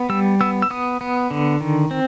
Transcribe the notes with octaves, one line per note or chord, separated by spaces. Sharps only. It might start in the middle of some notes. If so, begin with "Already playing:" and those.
Already playing: B3
G3 E6
B3 E6
E6
B3 D#6
B3
D3
D#3
C4